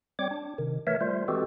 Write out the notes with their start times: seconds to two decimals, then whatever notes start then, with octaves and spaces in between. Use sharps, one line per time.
0.19 G3 C4 C#5 D6
0.31 D4
0.58 C3 D#3
0.87 E3 A3 A#4 C#5 E5
1.01 G3 A3 F4 C5
1.28 E3 G#3 C4 F#4 G4 A4